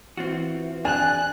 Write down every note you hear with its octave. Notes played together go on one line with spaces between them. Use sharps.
E3 C4 F4 F#4
D4 G#4 G#5 F#6